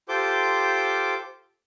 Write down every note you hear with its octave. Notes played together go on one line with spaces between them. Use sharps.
F4 G4 A4 C5 D6 G6